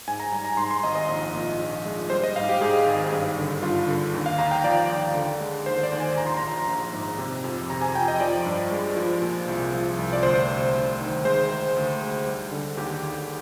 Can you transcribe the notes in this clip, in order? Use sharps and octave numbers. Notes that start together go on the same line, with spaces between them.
G#2 G#5
A#5
G3 G#5
A#5
G#2 C6
C6
G#1 D#5
D#5
A#1
A#2
A#1
G#3
G3 C5
D#5
G#2 F5
G4
G#2 G#4
G#1
G2
D3
G2 F4
D3
D#2
F5
D#2 A#5
G5
F3 D5
D#2
D3
G#3
D#2 C5
D5
D#2
G#5
A#1 A#5
C6
A#5
A#1
A#1
G#2
C3
F2
C3 A#5
G#5
F2 G5
D#5
F3 D5
G2
G#3
F3
A#2
C2
F3
C2
D5
D2 C5
C3
D2
D#3
G#3 C5
G#3
D2
G#3
G3
D3
D#2 G4
D#2